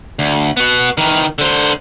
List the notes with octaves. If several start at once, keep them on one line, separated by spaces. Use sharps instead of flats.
D2
B3 F#4
D#3 E3
D3 C5